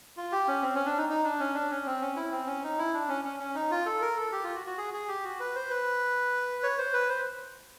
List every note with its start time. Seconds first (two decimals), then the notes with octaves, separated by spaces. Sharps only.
0.17 F4
0.32 G4
0.48 C#4
0.62 C4
0.75 C#4
0.86 D4
0.98 D#4
1.09 D#4
1.24 D4
1.40 C#4
1.55 D4
1.71 C#4
1.86 C4
2.02 C#4
2.16 E4
2.32 C4
2.47 C#4
2.63 D#4
2.79 E4
2.94 D4
3.08 C#4
3.25 C#4
3.40 C#4
3.55 D#4
3.71 F4
3.86 A4
4.02 A#4
4.17 A4
4.32 G4
4.44 F4
4.55 F#4
4.67 F#4
4.78 G#4
4.94 G#4
5.08 G4
5.24 F#4
5.40 B4
5.56 C5
5.70 B4
6.63 C#5
6.79 C5
6.93 B4
7.09 C5